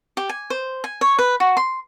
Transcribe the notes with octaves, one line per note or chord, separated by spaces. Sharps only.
G4
G#5
C5
G#5
C#5
B4
F#4
C6